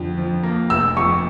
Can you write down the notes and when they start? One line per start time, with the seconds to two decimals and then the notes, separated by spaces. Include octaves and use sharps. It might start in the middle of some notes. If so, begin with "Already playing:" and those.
Already playing: F2 D3
0.18 F3
0.43 A#3
0.70 F1 E6
0.97 F2 C#6